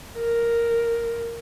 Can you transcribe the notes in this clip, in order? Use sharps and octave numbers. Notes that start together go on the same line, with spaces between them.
A#4